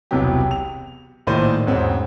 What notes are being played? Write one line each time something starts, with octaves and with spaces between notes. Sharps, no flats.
E1 C2 C3 E3 F#3 G4
F7
A#1 A2 D#3 C5 D5 D#7
E2 G#2 B2 C4 C#4